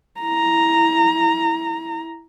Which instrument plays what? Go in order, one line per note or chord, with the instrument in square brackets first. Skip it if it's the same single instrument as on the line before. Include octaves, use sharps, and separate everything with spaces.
[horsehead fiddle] E4 A#5